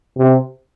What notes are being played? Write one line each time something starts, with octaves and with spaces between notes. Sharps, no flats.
C3